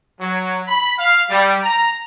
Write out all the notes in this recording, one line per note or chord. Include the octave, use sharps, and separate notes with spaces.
F#3
B5
F5
G3
A#5